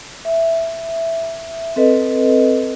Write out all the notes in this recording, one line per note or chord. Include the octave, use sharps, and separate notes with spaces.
E5
C4 A4 B4 D#5